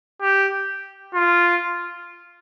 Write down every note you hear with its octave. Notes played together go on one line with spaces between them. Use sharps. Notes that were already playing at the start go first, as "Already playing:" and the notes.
G4
F4